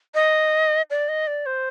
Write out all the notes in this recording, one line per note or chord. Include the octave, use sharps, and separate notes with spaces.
D#5
D5
D#5
D5
C5